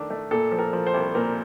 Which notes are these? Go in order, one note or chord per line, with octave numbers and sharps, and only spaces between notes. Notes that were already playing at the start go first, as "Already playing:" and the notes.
Already playing: D#3 A3 D4
A3
A#2 A4
F3
A#4
F3
C5
C2
A#2 A#4